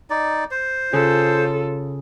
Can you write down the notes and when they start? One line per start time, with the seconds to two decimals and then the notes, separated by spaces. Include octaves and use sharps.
0.10 D#4 D5
0.51 C5
0.93 C#3 F4 A4